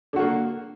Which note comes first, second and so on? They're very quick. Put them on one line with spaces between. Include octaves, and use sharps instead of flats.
D3 F#4 A#3